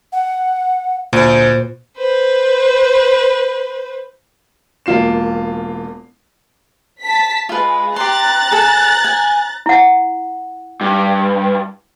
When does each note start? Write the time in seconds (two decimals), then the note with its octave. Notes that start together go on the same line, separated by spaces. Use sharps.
0.12 F#5
1.13 D2 A#2 C5
1.97 B4 C5
4.86 E1 A#3 F4 C7 E7
7.02 A5 B6
7.49 G#3 F4 B4
7.96 G4 A#5 C6 F#6 A6
8.51 G#4 A4
9.05 G#5
9.66 E4 F#5
10.81 G2